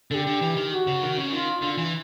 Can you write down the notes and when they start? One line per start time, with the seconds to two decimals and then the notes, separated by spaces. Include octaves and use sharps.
0.11 D3 A4
0.14 G4
0.27 D3
0.41 E3
0.56 D#3
0.71 G4
0.75 F#4
0.87 C#3
1.02 D#3
1.18 C#3
1.32 D#3 F4
1.62 D3
1.78 E3